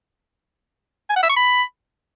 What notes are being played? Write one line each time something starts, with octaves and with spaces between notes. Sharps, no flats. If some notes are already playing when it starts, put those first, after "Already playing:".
G#5
F#5
E5
C#6
B5